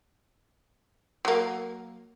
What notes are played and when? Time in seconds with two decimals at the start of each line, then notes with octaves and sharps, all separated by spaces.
1.25 F#3 A#3